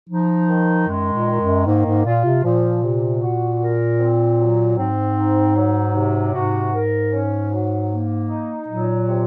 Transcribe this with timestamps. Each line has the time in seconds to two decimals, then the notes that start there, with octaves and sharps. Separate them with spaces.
0.09 F3 D#4
0.49 D#3
0.88 F#2 G#3
1.13 A#2
1.26 D#3
1.40 F#2
1.66 G#2 A#3
1.86 G#2
2.05 A#2 F4
2.25 C3
2.44 A#2 F3
2.83 C3
3.22 F#4
3.60 A#4
4.00 C4
4.40 F#3
4.78 G#2 C4
5.17 D#4
5.56 F#3
5.95 C3
6.34 G#2 F#4
6.73 A#4
7.12 C#4
7.52 F#3
7.91 A#3
8.29 D#4
8.68 A#2 F#3
9.07 C3